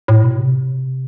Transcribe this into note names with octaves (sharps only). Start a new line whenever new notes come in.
A2
B2
C3